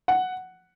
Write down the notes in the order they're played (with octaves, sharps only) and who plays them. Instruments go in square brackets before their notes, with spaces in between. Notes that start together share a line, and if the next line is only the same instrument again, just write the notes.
[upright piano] F#5